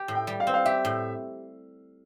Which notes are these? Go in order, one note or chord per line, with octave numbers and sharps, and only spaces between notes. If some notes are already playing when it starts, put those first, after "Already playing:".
Already playing: G4
A2
G5
G3
F5
C4
F5
G4 E5
A2